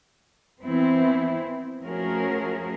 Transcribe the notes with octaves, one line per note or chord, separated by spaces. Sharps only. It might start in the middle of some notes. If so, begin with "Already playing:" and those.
E3 B3 C4 E4
F3 A3 C#4 F#4 G#4 A#4